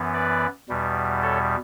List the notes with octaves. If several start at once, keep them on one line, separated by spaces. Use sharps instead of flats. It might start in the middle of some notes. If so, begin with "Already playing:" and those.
Already playing: F#2 E3 B3
B4 D5
E2 B2 G3
A4 C#5